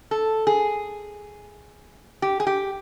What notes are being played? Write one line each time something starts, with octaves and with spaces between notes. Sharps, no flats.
A4
G#4
G4
G#4
G4